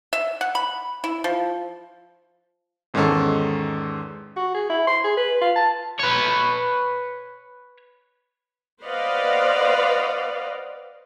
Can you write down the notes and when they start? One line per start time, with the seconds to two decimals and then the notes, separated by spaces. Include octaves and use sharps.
0.13 E5
0.41 F#5
0.55 B5
1.04 E4
1.24 F3
2.94 E2 G#2 D#3 G#3 C#4 A4
4.36 F#4
4.54 G#4
4.70 E4
4.87 C6
5.04 G#4
5.17 B4
5.41 F4
5.56 A5
6.00 B4 C#5
8.84 B4 C5 D5 D#5 F5 F#5